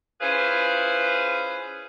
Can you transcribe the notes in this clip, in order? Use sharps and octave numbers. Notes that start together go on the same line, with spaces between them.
C#4 E4 F4 G#4 B4 C5